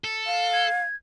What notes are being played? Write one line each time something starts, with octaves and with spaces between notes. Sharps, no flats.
A4
F5
G#6